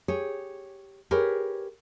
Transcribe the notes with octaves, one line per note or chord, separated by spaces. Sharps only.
G4 G#4 C#5
G4 G#4 A#4 B4 C#5